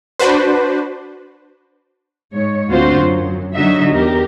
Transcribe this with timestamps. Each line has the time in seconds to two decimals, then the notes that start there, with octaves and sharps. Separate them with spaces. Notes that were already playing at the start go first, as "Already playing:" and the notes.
0.19 D4 F#4 B4 C5
2.33 G#2 C#5
2.70 D2 D3 C4 F4 F#4 C5
3.00 F#2
3.55 D3 F#3 D#4 F#4 E5
3.91 E2 G4 A#4